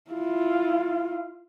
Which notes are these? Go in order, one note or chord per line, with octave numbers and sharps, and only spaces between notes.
E4 F4